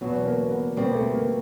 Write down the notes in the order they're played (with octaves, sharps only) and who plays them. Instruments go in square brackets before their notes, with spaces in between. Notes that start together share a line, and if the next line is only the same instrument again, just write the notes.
[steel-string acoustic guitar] E2 B2 F#3 [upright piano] B3
[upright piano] A#3
B3
[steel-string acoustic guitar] B2 G3 C4 [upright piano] A#3
[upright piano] A3
A#3